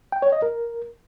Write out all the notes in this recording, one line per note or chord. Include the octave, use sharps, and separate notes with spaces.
G5
C#5
D#5
A#4